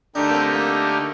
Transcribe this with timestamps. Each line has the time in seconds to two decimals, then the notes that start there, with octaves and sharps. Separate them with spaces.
0.15 D3 A3 D4 D#4 G4 A#4
0.30 A#3
0.35 C4
0.54 A#3